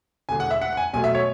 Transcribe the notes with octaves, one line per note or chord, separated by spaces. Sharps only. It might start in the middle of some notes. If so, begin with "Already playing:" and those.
E1 E2 D3 G#3 G#5
F#5
E5
F#5
F#5
G#5
B1 B2 F#3 A3 G#5
E5
C#5